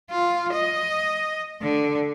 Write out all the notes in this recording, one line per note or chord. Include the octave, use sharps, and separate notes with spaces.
F4
D#5
D3